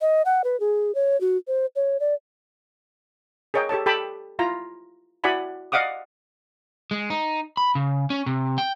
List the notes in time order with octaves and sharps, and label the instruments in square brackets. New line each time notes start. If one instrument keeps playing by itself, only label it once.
[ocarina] D#5
F#5
B4
G#4
C#5
F#4
C5
C#5
D5
[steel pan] G#4 A#4 C#5 D#5 G5
G4 A4 C#5 A5
G4 A4 G5 A5 B5 D6
E4 F4 A#5
E4 F#4 D5 F#5 G#5 B5
D5 D#5 F5 F#5 D6 D#6
[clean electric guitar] G#3
D#4
B5
C#3
C#4
C3
G5